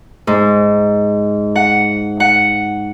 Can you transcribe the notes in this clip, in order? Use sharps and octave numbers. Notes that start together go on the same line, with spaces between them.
G#2
F#5
F#5